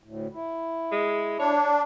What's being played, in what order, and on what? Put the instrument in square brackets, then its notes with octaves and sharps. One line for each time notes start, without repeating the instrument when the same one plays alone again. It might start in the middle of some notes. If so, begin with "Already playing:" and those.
[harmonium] D2 A2
E4
[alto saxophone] G#3
[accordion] D4 [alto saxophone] C#5